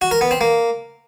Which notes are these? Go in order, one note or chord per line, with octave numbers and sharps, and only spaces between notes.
F#4
A#4
B3
C4
A#3